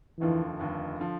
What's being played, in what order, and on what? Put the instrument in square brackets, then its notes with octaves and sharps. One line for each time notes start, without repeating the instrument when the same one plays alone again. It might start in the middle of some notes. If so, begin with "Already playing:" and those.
[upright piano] F1 D#2 D3 F3 [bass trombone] E3
[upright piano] F1 D#2 D3 F3
D3 F3